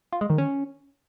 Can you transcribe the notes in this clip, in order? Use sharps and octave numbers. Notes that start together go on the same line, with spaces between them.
F4
G#3
D#3
C#4